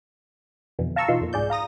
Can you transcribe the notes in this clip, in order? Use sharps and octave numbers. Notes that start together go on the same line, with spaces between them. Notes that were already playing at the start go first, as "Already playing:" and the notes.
F2 B2 D3 E3
F5 A5 A#5 C#6 E6
B2 E3 D#4 F4 C6
F2 A#2
C2 G#2 G#4 D5 G6
F5 A#5 D#6 A#6